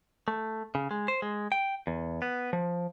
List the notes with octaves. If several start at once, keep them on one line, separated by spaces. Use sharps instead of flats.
A3
C#3
G#3
C5
G#3
G5
E2
B3
F3